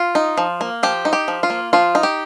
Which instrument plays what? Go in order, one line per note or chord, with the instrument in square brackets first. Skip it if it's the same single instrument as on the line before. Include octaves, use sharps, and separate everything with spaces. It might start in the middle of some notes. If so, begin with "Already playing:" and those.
Already playing: [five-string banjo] F4
D#4
F3
A#3
F3 G4
D#4
G4
F3
F4
A#3
F3 F4
D#4
G4